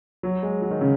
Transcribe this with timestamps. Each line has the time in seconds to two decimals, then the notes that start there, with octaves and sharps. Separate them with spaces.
0.23 F#3
0.43 G#3
0.62 F#3
0.71 D#3
0.81 C#3